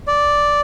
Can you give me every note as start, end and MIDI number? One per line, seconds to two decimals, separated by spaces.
0.08 0.61 74